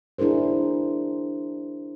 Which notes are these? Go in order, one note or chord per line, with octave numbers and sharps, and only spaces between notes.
D4 E4 G#4 A#4 C5